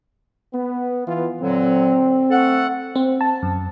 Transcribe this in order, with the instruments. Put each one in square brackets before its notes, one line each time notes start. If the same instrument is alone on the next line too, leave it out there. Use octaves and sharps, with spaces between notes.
[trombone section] B3
E3 B3 F4
[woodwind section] A#2 D3 F#3 [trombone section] C4
[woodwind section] A3 A4 F#5
[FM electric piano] C4
A5
F#2